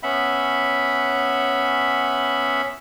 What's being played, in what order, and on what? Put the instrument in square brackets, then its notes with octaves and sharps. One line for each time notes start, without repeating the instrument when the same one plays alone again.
[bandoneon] B3 C#4 E5 F#5 B5